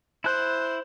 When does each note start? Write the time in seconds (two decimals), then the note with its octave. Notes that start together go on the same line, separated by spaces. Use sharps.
0.24 E4 C5 F#6